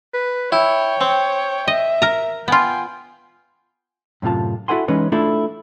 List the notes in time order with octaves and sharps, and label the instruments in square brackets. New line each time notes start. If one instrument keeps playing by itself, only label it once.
[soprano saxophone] B4
[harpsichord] E4 [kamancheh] C#5 [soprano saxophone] G5
[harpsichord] C4
[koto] D#5 [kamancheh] E5
[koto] A#4 A#5
[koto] B3 F4 [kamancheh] G5 G#5
[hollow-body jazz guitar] F#2 A2 C3 F4 A5
E4 F#4 A4 F#5 G#5 C6
E3 G#3 C#4 D#4 B4
A3 D4 E4 F4 A4